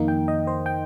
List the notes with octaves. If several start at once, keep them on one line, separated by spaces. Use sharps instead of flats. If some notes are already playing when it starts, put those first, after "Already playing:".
Already playing: F2 D#3 A#3 D#4
G5
D#5
C5
G5